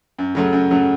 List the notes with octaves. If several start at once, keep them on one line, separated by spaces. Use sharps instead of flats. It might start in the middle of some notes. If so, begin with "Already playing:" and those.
F#2
C#3 F#3 A3
F#2
C#3 F#3 A3